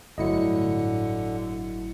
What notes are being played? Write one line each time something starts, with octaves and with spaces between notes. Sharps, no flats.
G1 A2 D3 F#3 E4 D#5 C#7